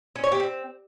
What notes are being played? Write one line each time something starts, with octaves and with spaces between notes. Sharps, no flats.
C#4
C#5
G4
C4